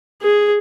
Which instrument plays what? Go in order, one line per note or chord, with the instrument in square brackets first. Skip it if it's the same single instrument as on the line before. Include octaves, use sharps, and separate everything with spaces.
[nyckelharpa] G#4